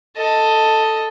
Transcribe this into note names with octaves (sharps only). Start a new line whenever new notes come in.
A4 D#5